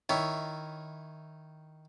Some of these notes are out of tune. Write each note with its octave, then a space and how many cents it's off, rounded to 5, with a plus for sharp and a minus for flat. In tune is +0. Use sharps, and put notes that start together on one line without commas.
D#3 +0 E4 +0 C#5 +0